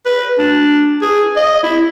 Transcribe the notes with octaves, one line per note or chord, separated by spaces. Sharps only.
B4
D4
G#4
D#5
E4